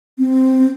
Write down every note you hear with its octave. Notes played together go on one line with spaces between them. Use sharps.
C4